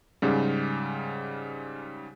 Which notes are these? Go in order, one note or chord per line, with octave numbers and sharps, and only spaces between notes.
G#2 C#3 G3